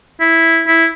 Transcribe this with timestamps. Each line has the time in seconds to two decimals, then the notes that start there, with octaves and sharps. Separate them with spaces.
0.20 E4
0.67 E4